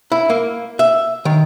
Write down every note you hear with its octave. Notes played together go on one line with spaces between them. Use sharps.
E4
A#3
E5
D#3